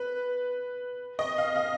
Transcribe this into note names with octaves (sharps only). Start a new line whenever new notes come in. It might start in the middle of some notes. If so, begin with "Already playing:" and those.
Already playing: B4
D#5
F5
F5